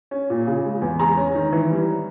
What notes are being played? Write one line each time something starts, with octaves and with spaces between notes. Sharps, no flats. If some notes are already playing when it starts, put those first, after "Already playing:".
C#4
A#2
C#3
G#3
E2
G#3 A#5
C#4
D#3
E3
G3